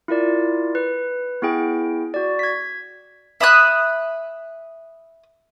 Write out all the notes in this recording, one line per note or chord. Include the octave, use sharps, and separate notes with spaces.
E4 F4 A#4 D5
B4
B3 E4 G#4 G5
F#4 D5
G#6 B6
E5 B5 D#6 F#6